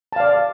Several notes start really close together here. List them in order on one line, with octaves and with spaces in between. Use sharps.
A5 F5 D5